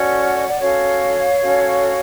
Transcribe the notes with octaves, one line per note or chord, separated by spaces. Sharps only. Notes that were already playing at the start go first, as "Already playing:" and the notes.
Already playing: C#4 F#4 A4 D5 F#5
C#5
D5
C#4 F#4 A4 C#5 F5
C#4 F#4 A4